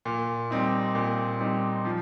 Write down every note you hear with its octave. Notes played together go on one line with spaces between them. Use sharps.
A#2
G3 C4 D#4
A#2
G3 C4 D#4
F3